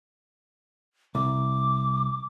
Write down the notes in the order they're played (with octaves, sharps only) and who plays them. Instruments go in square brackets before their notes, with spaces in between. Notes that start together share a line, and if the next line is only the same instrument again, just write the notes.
[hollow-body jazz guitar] C2 [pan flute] D6